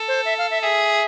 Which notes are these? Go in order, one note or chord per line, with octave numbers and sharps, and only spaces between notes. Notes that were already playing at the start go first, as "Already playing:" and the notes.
Already playing: A4
C5
E5
F5
E5
G#4 E5